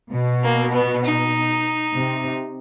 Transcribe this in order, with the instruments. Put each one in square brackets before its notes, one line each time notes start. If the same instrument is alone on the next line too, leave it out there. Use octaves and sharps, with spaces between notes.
[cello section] B2
[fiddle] A#3
B3
D#4
[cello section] C3